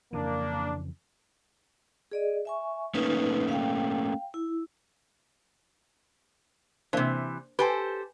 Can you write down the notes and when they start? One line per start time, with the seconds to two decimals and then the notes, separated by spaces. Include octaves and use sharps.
0.13 F2 C#3 E3 A#3 D4
2.12 G#4 D5 D#5
2.45 E5 G#5 C#6
2.95 A3 A#3 C#4 D#4 B4
3.49 F5 G5
4.34 E4
6.93 C3 E3 A#3 D4 C5
7.59 G4 A4 B4 C5 G5 G#5